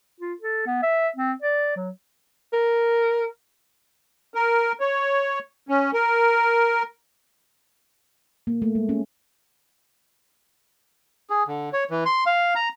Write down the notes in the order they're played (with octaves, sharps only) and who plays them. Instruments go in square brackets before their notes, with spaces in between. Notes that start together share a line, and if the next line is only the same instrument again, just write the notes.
[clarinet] F4
A4
B3
E5
C4
D5
F#3
[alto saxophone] A#4
[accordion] A#4
C#5
C#4
A#4
[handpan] A#3
A3
G#3
C#4
[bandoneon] G#4
D3
C#5
E3
C6
F5
A#5